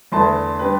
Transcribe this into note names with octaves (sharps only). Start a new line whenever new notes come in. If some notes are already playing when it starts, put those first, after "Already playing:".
E2 D3 A3 E4 B4 A5 C6
G3 D4 G4 B4